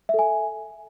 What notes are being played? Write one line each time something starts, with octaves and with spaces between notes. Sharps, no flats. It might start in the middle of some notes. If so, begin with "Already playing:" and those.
A4 E5 G#5